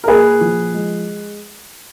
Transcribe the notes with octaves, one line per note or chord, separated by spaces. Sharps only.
A#4
A#2 G#4 B4
F3
G#3